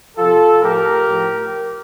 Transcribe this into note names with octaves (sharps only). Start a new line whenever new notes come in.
C3 F3 F4 A4
A2 F3 G4 A#4
A2 F3